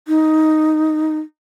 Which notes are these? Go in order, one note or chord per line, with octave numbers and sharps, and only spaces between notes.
D#4